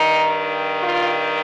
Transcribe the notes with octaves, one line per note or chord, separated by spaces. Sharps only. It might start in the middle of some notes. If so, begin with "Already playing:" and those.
Already playing: G2 D#3 D#4
F4